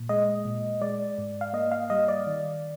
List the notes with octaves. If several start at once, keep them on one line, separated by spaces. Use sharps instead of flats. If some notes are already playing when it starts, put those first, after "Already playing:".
Already playing: A#2
G#3 D#5
A#2
G#3 D5
G#2
F5
A#3 D#5
F5
G3 D#5
D5
D#3